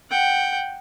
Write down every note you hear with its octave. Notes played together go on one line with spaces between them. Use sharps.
F#5 G5